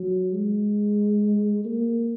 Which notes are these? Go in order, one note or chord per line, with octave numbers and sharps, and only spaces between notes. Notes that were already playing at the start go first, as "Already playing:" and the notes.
Already playing: F#3
G#3
A#3